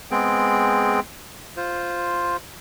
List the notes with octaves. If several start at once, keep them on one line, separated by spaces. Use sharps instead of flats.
G#3 B3 C4 G#4 G5
F4 C5